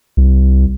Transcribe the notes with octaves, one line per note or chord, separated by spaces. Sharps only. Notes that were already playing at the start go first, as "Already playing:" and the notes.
C2